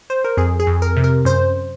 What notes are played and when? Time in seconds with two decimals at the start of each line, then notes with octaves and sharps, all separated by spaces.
0.10 C5
0.24 A#4
0.37 F2 G#4
0.60 G#4
0.67 F2
0.82 A#4
0.96 C3
1.04 A#4
1.25 F#2 C5